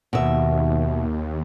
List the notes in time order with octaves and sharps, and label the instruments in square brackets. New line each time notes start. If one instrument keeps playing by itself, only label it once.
[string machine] D#2 [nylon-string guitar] B2 E5